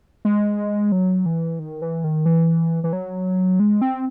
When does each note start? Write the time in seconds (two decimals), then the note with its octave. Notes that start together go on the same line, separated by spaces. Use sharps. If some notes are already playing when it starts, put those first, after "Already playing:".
0.25 G#3
0.92 F#3
1.26 E3
1.59 D#3
1.82 E3
2.04 D#3
2.26 E3
2.84 E3
2.93 F#3
3.60 G#3
3.81 C4